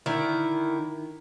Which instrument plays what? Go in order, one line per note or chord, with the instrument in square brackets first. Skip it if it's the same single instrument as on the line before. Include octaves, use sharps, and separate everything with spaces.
[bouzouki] D3 D#3 E4